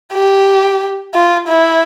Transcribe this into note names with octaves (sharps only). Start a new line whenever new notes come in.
G4
F4
E4